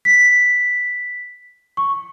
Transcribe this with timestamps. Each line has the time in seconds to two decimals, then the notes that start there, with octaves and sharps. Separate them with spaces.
0.05 B6
1.77 C#6